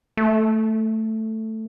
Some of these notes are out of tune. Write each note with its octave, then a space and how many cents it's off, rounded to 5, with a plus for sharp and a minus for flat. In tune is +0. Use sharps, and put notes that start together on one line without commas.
A3 +5